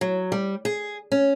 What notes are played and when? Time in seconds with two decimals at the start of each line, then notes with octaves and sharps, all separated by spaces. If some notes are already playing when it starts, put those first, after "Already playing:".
0.01 F#3
0.32 G3
0.65 G#4
1.12 C#4